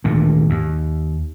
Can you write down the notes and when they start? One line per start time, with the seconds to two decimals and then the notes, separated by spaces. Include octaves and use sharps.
0.04 G#1 D2 A#2
0.50 D#2